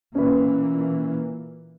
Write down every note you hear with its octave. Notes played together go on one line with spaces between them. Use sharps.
A#2 E3 A#3 C#4 B4